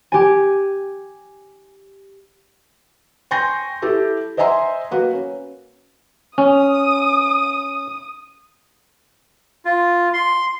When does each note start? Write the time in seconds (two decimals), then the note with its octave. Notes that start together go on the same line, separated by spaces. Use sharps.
0.12 G4 G#5
3.31 G5 G#5 C6 C#6 G6 A#6
3.82 E4 G4 A4
4.37 C5 D#5 E5 G#5 A#5 C6
4.91 A#3 F#4 B4
5.13 C#4
6.38 C#4 D#6
9.65 F4
10.13 C6